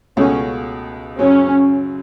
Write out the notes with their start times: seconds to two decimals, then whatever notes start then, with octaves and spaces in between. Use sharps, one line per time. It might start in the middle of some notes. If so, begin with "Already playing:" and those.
0.17 C#2 B2 A3 C#4 F#4
1.19 F#2 C#3 F#3 C#4